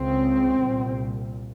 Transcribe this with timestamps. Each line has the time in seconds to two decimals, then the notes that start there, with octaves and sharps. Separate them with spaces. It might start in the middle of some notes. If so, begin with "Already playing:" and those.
Already playing: C#2 C#3 C4
0.63 C2 A#2